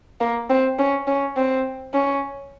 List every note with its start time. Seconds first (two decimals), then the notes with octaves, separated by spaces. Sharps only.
0.20 A#3
0.50 C4
0.78 C#4
1.07 C#4
1.36 C4
1.94 C#4